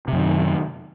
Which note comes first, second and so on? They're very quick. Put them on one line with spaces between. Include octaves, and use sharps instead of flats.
C3 F#2 D#3